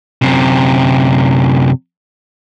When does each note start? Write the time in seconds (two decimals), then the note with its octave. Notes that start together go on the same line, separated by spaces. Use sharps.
0.22 F#2 C3